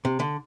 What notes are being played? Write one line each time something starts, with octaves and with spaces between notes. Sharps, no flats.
C3
D3